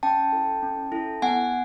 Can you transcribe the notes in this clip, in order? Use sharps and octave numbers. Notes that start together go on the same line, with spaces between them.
C#4 G5 A5
E4 A4
C#4
E4 A4
B3 F#5 G#5